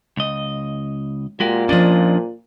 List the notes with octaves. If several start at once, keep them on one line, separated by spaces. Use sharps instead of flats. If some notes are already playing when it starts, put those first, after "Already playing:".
C#2 D#5
A#2 G#3 F#4 G4
F3 C#4 D4 D5 D#5